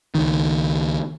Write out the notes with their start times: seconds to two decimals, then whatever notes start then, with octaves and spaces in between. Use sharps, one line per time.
0.15 C#2 D#3